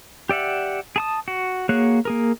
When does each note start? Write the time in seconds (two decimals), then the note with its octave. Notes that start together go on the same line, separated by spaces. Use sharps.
0.29 G4 D5 E5 F#5
0.96 G#4 A5 D#6
1.28 F#4
1.69 A#3 F#4 G#4 C#5 F#6
2.05 A#3 G#4 A#4